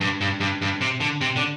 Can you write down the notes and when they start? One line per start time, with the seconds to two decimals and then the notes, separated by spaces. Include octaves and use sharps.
0.01 G2
0.21 G2
0.40 G2
0.62 G2
0.81 C3
1.00 D3
1.21 C3
1.36 D3